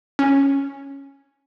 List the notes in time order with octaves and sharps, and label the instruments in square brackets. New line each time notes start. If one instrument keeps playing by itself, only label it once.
[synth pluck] C#4